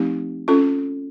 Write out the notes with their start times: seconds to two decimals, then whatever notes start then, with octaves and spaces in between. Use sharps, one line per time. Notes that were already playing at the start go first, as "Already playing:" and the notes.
Already playing: F3 A3 C4 D#4 G4
0.48 C#4 F4 A4